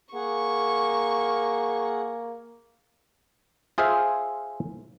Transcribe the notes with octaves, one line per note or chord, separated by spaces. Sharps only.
A#3 G#4 F#5 C#6
F4 G#4 C5 E5 F5